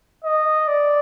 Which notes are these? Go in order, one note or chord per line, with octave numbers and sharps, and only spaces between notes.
D#5
D5